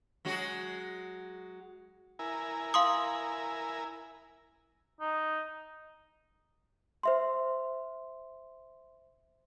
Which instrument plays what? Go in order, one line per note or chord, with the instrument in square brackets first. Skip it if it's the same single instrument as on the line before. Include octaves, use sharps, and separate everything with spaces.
[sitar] F#3 G#3 F#4
[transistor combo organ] E4 A#4 G#5
[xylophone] F5 C6 D#6
[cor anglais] D#4
[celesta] C5 E5 C6